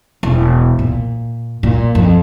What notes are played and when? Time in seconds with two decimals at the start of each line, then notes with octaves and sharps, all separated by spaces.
0.23 E1
0.79 A#2
1.63 A#2
1.95 F2